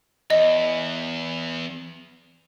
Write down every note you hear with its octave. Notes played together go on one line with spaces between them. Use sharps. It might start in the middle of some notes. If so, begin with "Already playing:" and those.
E2 D#5